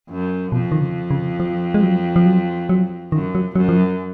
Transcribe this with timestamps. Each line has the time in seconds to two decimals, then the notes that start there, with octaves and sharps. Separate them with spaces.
0.09 F#2
0.52 F2 B2
0.72 D#3
0.81 C#3
1.11 C#3
1.40 F3
1.74 G#3
1.83 F#3
2.16 F3
2.26 F#3
2.69 F#3
3.12 F#2 D#3
3.35 F#3
3.56 F#2 F#3
3.69 F3
3.78 F#3